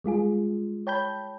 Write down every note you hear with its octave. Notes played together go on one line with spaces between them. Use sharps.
G3 G#3 F4 G#4
C#5 G5 A5 B5 G6